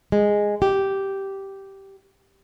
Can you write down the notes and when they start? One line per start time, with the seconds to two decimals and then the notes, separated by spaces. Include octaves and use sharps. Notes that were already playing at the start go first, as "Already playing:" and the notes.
0.12 G#3
0.62 G4